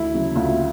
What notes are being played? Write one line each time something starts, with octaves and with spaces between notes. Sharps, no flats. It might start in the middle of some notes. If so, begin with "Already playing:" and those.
Already playing: D2 E4
C#3 F#3
D2 F4